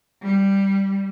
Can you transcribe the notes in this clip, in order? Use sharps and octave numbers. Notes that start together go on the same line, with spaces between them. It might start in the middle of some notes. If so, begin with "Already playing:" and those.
G3